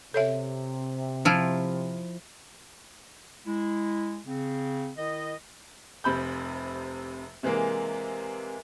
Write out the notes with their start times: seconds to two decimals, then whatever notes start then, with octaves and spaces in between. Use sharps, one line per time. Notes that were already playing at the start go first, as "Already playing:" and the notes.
0.14 C3 A4 C#5 E5
1.25 F3 E4 F4
3.47 G#3 E4
4.27 C#3 C4
4.97 D#3 E4 D#5
6.04 F1 C3 B5 G6
7.43 C3 E3 G#3 A#3